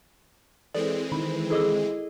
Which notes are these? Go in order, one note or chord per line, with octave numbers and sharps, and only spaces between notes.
E3 G#3 C4 A4 D5
D#3 B5
E4 G#4 A4 D#5 D6 E6